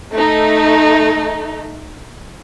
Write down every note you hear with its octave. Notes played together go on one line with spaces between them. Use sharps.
A3 D#4